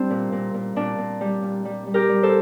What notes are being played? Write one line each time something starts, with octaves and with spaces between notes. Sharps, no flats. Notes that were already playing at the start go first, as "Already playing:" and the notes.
Already playing: G3 C4 D4 E4
A#2
A#2
A#2
A#2 D4
A#2
G3
A#2
G3
G3
G4 A#4
G3
A4 C5